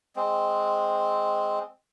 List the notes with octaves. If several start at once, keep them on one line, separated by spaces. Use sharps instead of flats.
G#3 C4